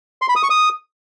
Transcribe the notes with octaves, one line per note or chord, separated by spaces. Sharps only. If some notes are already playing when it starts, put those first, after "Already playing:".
C6
B5
D#6
C#6
D#6